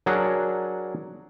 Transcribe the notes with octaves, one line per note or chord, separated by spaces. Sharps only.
F#3 D4 G#4 A#4 F#5